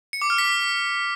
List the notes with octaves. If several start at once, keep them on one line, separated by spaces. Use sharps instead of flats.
C#7
D6
F6
B6